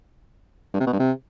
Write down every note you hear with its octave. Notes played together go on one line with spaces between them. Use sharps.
G2
C3
B2
G2
C3